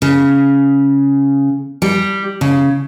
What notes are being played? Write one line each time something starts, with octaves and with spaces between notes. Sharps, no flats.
C#3
G3
C#3